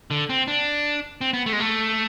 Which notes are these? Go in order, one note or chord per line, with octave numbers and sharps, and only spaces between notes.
D3
C4
D4
C4
B3
A3
G#3
A3